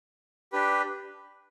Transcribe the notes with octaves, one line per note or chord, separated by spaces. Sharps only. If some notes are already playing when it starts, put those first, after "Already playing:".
D4 G4 B4